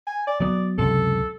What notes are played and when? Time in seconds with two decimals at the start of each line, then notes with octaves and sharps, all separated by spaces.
0.07 G#5
0.27 D5
0.40 F#3 B3 D5
0.78 C#2 F#2 C3 A4